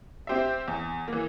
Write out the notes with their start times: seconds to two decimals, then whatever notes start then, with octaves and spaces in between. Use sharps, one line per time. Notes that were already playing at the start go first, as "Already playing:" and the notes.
0.27 C4 G4 C5 E5
0.68 E2
1.08 E3 A#3